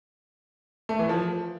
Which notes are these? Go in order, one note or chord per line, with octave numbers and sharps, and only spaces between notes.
A3
E3
F3